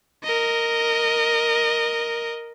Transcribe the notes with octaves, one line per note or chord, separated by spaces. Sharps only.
A#4 D#5